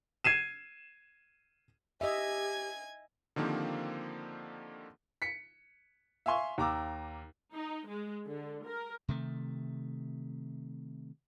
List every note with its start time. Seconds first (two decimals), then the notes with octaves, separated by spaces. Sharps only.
0.24 G#6 C7 D#7 E7
2.01 G4 D#5 E5 G#5 G#6
3.36 D3 D#3 F3 A#3 C4 G4
5.22 B6 C#7
6.26 E5 F5 G#5 C6 C#6
6.58 D#2 A#5 D6 E6
7.56 D#4
7.89 G#3
8.25 D3
8.67 A#4
9.08 C3 D#3 A3